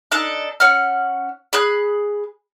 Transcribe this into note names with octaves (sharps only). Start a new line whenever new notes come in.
D4 D#4 A4 F#6
C#4 F#5 F6
G#4 B5 F#6